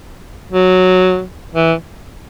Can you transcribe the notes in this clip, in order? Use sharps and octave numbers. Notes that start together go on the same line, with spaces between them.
F#3
E3